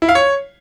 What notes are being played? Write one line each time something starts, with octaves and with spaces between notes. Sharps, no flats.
E4
F5
C#5